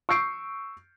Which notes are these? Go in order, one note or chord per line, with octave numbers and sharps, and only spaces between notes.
C#6 E6 G6 C7 D7